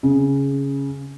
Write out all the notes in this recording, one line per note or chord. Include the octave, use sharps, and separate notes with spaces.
C#3